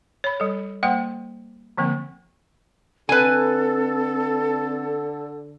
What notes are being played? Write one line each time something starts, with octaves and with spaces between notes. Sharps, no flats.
C#5 B5
G3 A4
G3 A#3 C5 F#5 G5 C6
D3 F3 A#3 C4
D3 C4 A4 B4 G#5